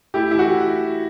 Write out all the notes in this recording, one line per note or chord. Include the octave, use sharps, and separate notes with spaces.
A3 E4 G4
E4
E3 F#4